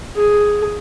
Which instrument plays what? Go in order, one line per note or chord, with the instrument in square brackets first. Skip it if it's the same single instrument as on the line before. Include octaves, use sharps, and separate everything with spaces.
[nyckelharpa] G#4